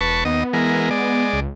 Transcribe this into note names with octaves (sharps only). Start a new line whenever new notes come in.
E1 B4 A5 C#6
D#2 B3 D#5
E3 G#3 A#4
G#3 D5
C#2